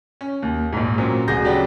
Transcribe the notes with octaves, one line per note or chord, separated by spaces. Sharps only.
C#4
D#2
A#1 G#2
A#2 F#3 C4 C#4
D1 F#4 G#4 G6 A#6
C#3 F#3 G#3 B3 D4 G4